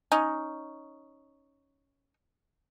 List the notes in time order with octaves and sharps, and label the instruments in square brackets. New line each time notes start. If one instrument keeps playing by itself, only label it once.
[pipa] C#4 D#4